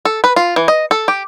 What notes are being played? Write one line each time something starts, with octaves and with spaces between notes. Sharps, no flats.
A4
B4
F4
E3
D#5
A4
G4